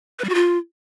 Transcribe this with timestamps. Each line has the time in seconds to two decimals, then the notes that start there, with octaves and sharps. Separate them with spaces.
0.19 B4
0.24 G3
0.29 F#4
0.35 F4